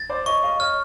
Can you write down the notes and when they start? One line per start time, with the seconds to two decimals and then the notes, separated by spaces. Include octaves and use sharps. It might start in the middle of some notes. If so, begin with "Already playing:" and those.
Already playing: A6
0.10 C5 D5
0.26 C#5 D#5 C#6
0.43 D#5 F5
0.59 C#5 D#5 F6